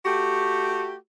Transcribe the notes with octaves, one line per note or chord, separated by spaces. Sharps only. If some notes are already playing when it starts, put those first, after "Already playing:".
A3 F#4 G4